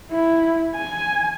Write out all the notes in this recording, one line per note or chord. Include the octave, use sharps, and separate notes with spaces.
E4
G#5